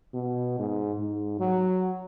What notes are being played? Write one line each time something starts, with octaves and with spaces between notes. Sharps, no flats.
B2
G#2
G#2
F#3